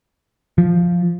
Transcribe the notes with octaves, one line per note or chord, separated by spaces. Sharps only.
F3